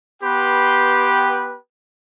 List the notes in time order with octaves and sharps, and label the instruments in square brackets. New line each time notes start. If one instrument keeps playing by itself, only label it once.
[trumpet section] B3 G4 B4 G5 B5 C6